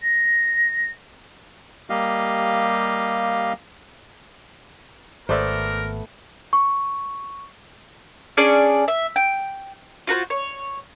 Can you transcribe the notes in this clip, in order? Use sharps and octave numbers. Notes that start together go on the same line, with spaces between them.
A#6
G3 A#3 G4 D#5 F5
G#1 A3 B3 A#4 C5 D5 E5
C#6
C#4 D4 G#4 D5
E5
G5
F4 F#4 B4 C5
C#5